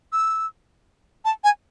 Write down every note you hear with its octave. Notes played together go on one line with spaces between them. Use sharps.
E6
A5
G#5